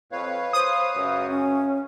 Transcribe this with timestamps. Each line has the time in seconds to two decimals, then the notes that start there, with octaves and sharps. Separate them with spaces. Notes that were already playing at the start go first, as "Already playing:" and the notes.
0.12 F2 B4 C#5 F5
0.53 C5 D#6
0.96 C#2 F#2
1.29 C#4